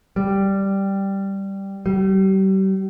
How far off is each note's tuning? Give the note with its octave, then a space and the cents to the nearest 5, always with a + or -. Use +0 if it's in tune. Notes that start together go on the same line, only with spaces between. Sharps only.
G3 +0
G3 -35